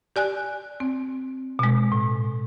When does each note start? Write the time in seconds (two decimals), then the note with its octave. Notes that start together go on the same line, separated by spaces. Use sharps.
0.16 G4 D5 G#5 F#6
0.80 C4
1.59 B2 G#3
1.92 A2